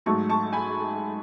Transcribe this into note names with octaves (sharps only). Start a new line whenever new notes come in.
G#2 F#3 A3 A5 C#6
A5 C#6
G#5 B5